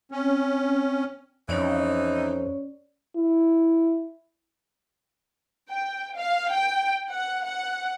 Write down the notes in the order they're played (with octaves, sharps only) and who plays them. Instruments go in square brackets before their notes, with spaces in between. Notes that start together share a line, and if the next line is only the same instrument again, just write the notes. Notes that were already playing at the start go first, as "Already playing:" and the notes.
[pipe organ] C4 [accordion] C#4
[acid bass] F2 [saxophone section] E3 D#4 [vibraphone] C#4 C#5 D5
[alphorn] E4
[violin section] G5
F5
G5
F#5
F#5